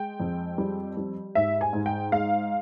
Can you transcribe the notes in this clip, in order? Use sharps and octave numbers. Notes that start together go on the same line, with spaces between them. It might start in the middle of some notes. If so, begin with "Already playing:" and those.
Already playing: G#3 G5
F2
G3
G3
G#2 E5
G#5
G#2
G5
G#3 F5